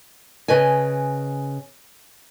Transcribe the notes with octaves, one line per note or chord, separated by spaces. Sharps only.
C#3 B4 D#5 G#5